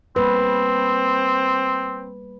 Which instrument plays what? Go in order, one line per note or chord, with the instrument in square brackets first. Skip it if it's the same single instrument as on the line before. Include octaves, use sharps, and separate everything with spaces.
[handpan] G3 A#3 B4 [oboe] C4